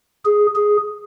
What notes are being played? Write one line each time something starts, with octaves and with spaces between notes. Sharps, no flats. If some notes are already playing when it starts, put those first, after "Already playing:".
G#4
G#4